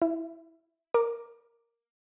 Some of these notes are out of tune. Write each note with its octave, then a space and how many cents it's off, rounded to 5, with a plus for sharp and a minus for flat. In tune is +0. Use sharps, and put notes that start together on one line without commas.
E4 -5 E5 +30
A#4 +0 D6 +0